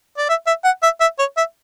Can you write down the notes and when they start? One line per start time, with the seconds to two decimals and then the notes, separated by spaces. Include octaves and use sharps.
0.18 D5
0.29 E5
0.47 E5
0.64 F#5
0.83 E5
1.00 E5
1.19 C#5
1.37 E5